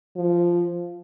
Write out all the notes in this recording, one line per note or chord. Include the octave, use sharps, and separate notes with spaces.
F3